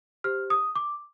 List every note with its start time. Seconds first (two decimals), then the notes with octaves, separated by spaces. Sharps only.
0.24 G4 C5 F6
0.50 D#6
0.76 D6